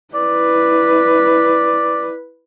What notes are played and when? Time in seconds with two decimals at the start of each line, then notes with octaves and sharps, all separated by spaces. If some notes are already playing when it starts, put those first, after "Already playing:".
0.15 E4 B4 D5